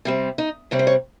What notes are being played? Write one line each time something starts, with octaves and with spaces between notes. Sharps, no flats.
C3 G3 C4
D#4
C3 G3 C4 C#5
C5
C#5